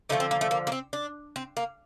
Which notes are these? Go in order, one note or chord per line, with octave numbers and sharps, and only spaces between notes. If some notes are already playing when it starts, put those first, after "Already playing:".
D3 F3 A3 D#4
C4
A#3
A3
A#3
A#3
C4
D4
C4
A#3